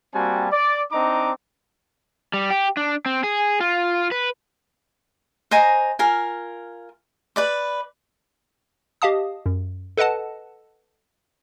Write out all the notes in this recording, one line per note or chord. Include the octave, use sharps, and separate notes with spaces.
G3 A#3 C4 F#4 G#5 A5
D5
C4 D4 D#4 D#5 A#5 D6
G3
G4
D4
C4
G#4
F4
B4
C5 D#5 G#5 A#5
F4 A#4 G#5
B4 D5 D6
G4 D#5 F5 A5 D#6
F#2
A4 B4 D#5 F#5 A5